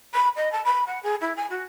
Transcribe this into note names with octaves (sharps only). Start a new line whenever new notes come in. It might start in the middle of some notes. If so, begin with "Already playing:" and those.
B5
D#5
A5
B5
F#5
G#4
E4
G#5
F#4